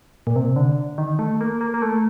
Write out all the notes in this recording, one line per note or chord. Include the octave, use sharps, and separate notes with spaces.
A#2
C3
D3
D#3
A3
A#3
A#3
A#3
A3